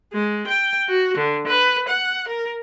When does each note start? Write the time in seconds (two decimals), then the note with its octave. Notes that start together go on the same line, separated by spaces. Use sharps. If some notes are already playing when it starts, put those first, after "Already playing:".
0.13 G#3
0.48 G5
0.89 F#4
1.18 D3
1.48 B4
1.89 F#5
2.28 A#4